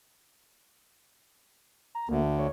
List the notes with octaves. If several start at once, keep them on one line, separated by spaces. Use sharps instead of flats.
A#5
D2 A#3
A3
C#5